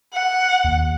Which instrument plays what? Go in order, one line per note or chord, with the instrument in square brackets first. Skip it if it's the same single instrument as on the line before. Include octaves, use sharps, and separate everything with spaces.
[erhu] F#5
[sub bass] D#2